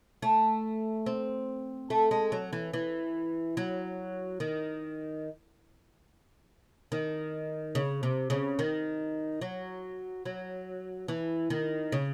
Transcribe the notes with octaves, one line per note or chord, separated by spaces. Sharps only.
A3
C4
A3
G#3
F#3
E3
E3
F#3
D#3
D#3
C#3
C3
C#3
D#3
F#3
F#3
E3
D#3
C#3